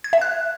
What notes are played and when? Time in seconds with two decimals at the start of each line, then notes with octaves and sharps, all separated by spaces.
0.04 G#6
0.13 E5
0.21 F#6